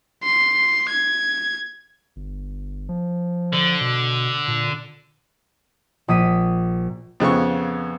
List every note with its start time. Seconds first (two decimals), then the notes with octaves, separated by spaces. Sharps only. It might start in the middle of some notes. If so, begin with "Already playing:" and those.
0.24 C6
0.89 G#6
2.16 G1
2.89 F3
3.53 D3
3.81 B2
4.48 A#2
6.08 A#1 D#6 B6 D#7
7.20 F2 C#3 B3 C#6